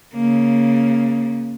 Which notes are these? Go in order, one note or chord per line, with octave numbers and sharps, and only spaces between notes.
C#3 A#3